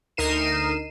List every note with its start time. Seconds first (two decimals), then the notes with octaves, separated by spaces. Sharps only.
0.17 D2 D#4 A#4 C7 D#7 E7